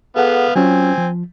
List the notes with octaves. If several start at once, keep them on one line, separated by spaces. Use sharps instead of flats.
B3 G#4 A4 F5 F#5
F#3 C4 C#4 F4 G#5
F3